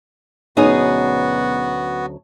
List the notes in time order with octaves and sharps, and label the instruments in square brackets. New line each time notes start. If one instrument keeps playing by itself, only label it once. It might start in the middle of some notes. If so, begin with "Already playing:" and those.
[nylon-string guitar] D2 F#3 C#4 [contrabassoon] B2 [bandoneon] B3 F#4 [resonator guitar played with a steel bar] D#4 G#4